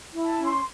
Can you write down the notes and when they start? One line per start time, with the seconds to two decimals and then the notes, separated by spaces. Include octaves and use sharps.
0.12 E4
0.25 A5
0.38 C#4
0.44 C6